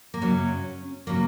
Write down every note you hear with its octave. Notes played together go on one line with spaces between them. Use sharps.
A#3
F#2 C#3 F#3 C#4
C#3 F#3 A#3